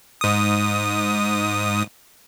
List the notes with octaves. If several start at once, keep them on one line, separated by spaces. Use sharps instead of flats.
G#2 D#6